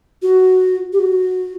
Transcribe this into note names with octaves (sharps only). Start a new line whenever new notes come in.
F#4
G4
F#4